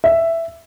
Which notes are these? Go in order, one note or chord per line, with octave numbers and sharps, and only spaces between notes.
E5